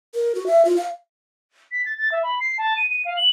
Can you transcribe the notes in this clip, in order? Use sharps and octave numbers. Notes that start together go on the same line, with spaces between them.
A#4
F#4
E5
F4
F5
B6
A6
A6
E5
B5
C7
A5
D#7
D#7
F5
F#7